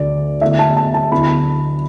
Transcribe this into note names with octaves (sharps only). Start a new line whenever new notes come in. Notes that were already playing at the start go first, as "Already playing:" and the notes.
Already playing: D2 D3 A3 D5
D3 A3 E4 E5
A5
A5
A5
D2 D3 B3 E4 B5